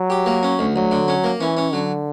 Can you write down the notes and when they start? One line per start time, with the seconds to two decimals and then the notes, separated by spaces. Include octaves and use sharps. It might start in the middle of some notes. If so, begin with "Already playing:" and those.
Already playing: F#3
0.10 G4
0.26 A#3
0.43 C#4
0.59 D2
0.75 D2 F#3
0.91 D3
1.08 C#4
1.24 A#3
1.40 E3 C#4
1.57 C#4
1.73 D3 F#3